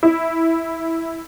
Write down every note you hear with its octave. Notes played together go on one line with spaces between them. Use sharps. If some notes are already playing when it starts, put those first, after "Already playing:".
E4